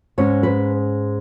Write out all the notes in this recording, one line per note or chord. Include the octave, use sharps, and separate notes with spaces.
G#2 G#3 C#4 C#5
B4